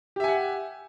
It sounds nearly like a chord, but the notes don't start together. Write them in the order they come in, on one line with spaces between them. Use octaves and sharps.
G4 E5 G#5 F#5